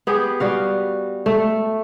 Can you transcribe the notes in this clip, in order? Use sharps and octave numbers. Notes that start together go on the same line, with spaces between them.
B3 G4 G#4
G3 F#4 F5
A3